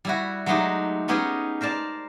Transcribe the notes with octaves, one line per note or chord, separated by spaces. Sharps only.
G3 E4 F#4
F#3 G#3 A3 D#4 F#4 G4
B3 C#4 D#4 G4 G#4
A#4 C5 D5 A5